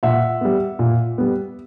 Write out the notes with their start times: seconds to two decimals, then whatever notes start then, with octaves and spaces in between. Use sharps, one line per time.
0.03 A#2 E5 F#5
0.41 G3 B3
0.79 A#2
1.18 G3 B3